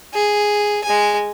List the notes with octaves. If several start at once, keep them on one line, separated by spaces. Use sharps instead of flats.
G#4
G#3 G#5